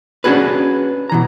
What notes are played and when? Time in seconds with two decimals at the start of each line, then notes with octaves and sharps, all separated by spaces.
0.24 C#4 D4 F#4 G#4 B4
1.10 B2 E3 A#5